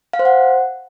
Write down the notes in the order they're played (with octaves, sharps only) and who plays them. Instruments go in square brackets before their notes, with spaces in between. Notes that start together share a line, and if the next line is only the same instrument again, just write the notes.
[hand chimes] F5
C5
F#5